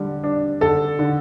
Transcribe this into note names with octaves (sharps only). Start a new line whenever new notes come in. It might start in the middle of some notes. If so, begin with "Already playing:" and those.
Already playing: D3 G3
D4
D3 A4
D3